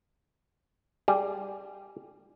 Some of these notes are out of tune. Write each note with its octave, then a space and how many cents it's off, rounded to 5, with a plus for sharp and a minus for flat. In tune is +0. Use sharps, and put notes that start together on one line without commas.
G3 +0 G#4 +0